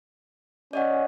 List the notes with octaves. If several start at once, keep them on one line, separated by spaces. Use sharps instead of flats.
C#4 D5 D#5 F#5